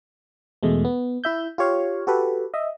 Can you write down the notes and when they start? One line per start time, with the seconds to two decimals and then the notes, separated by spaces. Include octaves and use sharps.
0.63 E2 B2 G#3 A3
0.85 B3
1.24 E4 E5 G6
1.58 F4 G4 C#5 F5
2.07 F#4 G4 A4 B4
2.54 D#5 E5